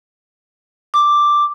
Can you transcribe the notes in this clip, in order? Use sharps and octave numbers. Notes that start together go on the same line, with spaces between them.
D6